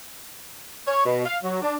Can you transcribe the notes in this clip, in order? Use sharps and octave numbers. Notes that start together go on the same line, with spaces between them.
C#5
B2
F5
F#3
D4